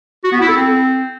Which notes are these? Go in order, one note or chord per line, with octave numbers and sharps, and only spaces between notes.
F#4
B3
E4
A4
C4